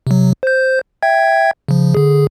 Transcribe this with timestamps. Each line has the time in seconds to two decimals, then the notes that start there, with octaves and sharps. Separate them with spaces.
0.07 C3 F#3
0.43 C5 G6
1.02 E5 G5 G#6
1.69 C#3 F3
1.95 D3 G#4